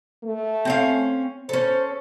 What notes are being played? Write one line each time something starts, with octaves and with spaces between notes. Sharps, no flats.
A3
C4 C#4 F5
C#4 A4 C5